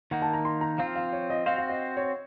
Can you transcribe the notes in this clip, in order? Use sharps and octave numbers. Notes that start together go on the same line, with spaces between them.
D#3 A#3 D#4 F#5
A5
A#5
C6
A#5
F3 C4 F4 F5
F5
C#5
D#5
C4 F#4 C5 F5
F5
D#5
C#5